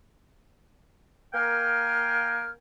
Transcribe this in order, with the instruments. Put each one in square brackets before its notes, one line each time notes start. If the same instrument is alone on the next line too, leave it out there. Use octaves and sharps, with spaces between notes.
[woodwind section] A#3 A#4 F5 G5 G#5 F6